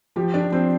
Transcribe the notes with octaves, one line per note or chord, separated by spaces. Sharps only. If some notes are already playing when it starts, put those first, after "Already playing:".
F3 G4
F3 D4 D5
F3 C4 C5